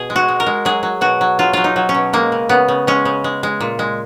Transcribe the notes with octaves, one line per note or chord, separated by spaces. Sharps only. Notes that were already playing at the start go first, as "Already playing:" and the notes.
Already playing: B2 G#4
G#3
F#4
G#3
A#4
G#3
F#3 G#4
F#3
B2 F#4
F#3
F#3 F4
F#3 F4
D#4
F#3
C#4
B2
G#3 A#3
C#3
C#3 B3
C#3
G#3 C#4
C#3
G#3
G#3
A#2
G#3